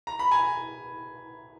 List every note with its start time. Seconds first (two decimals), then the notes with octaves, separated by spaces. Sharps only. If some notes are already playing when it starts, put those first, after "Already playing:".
0.07 A#5
0.19 B5
0.31 G#5 A#5